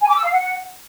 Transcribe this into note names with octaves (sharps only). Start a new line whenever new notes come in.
G#5
D6
E6
F5
F#5